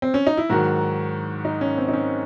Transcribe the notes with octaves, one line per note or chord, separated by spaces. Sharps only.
C4
C#4
D#4
E4
G#2 D#3 F#3 F#4
D#4
C#4
C4
D#4
C#4